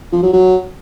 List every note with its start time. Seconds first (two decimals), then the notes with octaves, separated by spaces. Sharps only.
0.12 F3
0.23 F#3
0.33 F#3